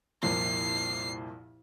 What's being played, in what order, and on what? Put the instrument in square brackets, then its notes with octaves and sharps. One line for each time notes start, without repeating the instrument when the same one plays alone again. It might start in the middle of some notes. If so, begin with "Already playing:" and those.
[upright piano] C2 F2 A#2 [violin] C7